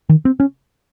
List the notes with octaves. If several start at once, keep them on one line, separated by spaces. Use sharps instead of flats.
D#3
C4
C#4